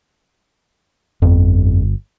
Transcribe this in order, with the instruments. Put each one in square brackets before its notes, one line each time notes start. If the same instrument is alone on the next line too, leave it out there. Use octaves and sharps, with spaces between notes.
[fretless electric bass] G1 [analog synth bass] F2